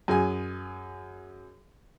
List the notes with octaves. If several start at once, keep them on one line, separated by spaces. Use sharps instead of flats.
F#2 G#4 G#5